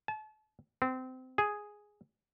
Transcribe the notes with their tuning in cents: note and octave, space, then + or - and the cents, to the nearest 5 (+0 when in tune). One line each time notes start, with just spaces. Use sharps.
A5 -35
C4 -25
G#4 +0